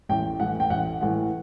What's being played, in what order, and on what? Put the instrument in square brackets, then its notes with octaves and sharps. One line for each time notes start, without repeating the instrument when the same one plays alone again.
[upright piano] A1 G5
A2 E3 F#5
G5
A1 F#5
A2 E3 F#5